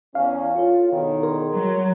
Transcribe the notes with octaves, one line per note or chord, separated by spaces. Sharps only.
E2 C#4 F5
E4 F4 A4 C#5
E2 B2 D#3
G#4 A#4 A#5 C6
F#3